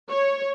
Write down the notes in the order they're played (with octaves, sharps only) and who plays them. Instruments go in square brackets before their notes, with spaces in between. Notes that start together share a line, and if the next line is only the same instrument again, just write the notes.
[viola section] C#5